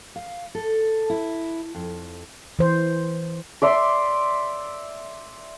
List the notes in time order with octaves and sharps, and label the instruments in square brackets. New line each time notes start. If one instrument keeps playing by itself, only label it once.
[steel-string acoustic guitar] F5
A4
E4
F2
[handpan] E3 C5
[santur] D5 E5 C6